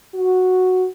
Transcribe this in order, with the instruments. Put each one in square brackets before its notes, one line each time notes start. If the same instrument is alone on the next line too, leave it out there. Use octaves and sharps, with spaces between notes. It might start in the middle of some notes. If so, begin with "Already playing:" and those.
[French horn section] F#4